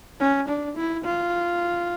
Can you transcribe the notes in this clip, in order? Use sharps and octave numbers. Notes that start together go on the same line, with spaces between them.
C#4
D4
E4
F4